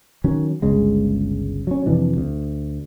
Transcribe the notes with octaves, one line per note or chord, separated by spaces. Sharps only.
D#3 F#3 C#4
G1 C#2 C#3 G#3
F#3 C#4
F2 C3 E3 D4
D2